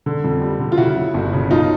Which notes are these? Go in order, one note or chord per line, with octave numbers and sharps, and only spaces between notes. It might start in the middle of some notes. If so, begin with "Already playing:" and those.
D3
F2
G3
D3
F4
C#3 E4 F#4
F#3
G1
C#3
B1 D#4 F4